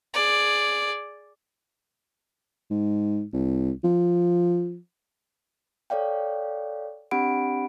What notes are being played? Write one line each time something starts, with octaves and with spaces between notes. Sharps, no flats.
G#4 D5
G#2
C2
F3
A4 C#5 D5 F5 G5
C4 D4 G4 F#5 B5 D7